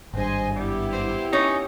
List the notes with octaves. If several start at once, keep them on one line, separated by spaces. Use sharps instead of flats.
G#1 G2 C5 D#5 G#5
G3 B3 E4 G4
C5
C#4 D#4